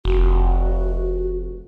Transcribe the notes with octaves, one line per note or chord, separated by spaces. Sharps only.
F1 F#4